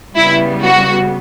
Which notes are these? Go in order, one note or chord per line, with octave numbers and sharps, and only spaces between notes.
C#3 G3 B3 E4
F#4